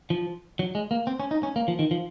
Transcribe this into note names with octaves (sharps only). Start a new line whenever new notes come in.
F3
F#3
G#3
A#3
C4
C#4
D#4
C#4
A#3
F3
D#3
F3